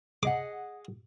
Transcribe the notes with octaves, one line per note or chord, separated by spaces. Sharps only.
G#4 D#5 F#5 D6